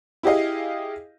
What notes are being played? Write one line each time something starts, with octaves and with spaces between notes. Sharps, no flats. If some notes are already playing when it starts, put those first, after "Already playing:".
E4 G4 G#4 D#5 F5